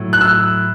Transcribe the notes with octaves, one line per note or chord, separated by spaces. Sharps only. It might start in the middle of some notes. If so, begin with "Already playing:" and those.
Already playing: A2 F#3
F#6
E6